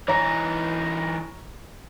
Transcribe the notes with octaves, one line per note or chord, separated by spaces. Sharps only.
E3 D#4 C#5 A#5